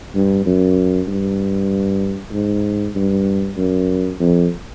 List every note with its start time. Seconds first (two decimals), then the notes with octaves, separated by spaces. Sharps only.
0.15 G2
0.46 F#2
1.07 G2
2.32 G#2
2.95 G2
3.57 F#2
4.20 F2